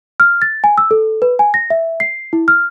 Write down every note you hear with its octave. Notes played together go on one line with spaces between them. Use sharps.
F6
A6
G#5
E6
A4
B4
G#5
A#6
E5
C7
E4
F6